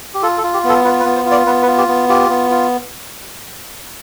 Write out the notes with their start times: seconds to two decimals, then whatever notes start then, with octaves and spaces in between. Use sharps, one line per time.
0.14 G4
0.22 F4 A4
0.38 A4
0.43 F4
0.54 G4
0.64 B3
0.69 A4
0.84 F4 B4
1.00 B4
1.05 B3
1.16 C5
1.26 F4
1.31 D5
1.46 B3 B4
1.62 B4
1.67 F4
1.78 G4
1.88 B3
2.09 F4 G4
2.30 B3
2.50 F4